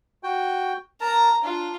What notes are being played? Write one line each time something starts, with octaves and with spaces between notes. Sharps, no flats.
F#4 G5
A#4 A5 A#5
D4 F4